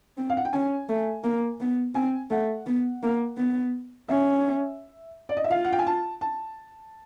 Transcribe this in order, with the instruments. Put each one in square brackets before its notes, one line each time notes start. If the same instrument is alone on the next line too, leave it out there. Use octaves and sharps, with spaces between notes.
[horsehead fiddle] C4
[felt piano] F5
F#5
G5
[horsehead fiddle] C#4 [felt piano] G#5
[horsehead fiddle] A3
A#3
B3
[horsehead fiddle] C4 [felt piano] G#5
[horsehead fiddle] A3 [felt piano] F#5
[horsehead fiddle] B3
A#3
B3
[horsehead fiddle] C#4 [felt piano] E5
[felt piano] D5
D#5
E5
[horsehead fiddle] F4 [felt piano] F5
[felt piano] F#5
G5
G#5
A5
A5